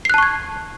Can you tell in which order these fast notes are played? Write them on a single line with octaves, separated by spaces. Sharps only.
C7 F#6 A5 C#6 G#6